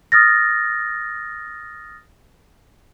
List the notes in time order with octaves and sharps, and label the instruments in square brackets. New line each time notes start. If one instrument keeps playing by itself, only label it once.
[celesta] D#6 F6 A6 A#6